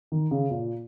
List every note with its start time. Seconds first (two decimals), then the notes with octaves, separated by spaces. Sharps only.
0.12 D#3
0.31 C#3
0.51 A#2